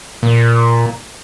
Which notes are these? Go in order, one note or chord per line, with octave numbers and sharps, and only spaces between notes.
A#2